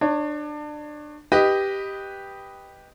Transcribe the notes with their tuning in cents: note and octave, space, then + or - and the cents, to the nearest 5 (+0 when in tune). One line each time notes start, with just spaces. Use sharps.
D4 +25 C#5 +0
G4 +5 B4 +0 D#5 +0